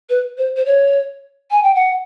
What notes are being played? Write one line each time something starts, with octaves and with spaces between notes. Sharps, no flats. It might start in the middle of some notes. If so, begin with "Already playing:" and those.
B4
C5
C5
C#5
G#5
G5
F#5